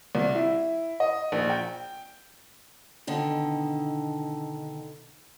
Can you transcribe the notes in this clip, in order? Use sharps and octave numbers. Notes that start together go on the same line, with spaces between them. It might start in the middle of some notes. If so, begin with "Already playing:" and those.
C2
E4
D#5
A#1
G5
B2 D3 D#3